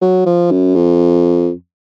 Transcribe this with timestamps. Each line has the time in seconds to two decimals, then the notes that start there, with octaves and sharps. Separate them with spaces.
0.01 F#3
0.26 F3
0.51 F#2
0.75 F2